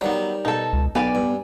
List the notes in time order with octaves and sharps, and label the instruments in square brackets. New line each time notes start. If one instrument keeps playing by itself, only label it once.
[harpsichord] D#3 G3 [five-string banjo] F#3 B3
[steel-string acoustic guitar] B2 A5 [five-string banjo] D#4 A4
[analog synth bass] C#2
[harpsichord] B1 [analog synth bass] B3 [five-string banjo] G4 B4 D5 [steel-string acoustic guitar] G#5
[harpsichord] G2